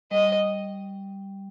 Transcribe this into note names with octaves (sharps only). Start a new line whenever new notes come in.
G3 D#5